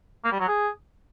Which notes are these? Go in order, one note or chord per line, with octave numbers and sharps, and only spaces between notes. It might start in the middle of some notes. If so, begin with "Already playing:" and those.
A#3
G3
F#3
G#4